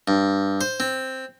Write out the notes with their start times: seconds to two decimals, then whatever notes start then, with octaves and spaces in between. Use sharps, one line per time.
0.08 G2
0.61 C5
0.80 C4